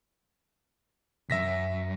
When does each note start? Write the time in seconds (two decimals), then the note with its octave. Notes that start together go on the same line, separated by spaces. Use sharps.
1.30 B1 F#2 E5 A#6 B6